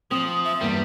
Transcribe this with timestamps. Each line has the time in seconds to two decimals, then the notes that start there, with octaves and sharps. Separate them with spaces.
0.11 F3 C4 D#6
0.45 E5
0.61 E2 G2 G3 A#3